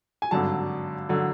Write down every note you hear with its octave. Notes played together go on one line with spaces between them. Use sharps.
G#5
G#1 G2 D3 F#3 A5
D3 F#3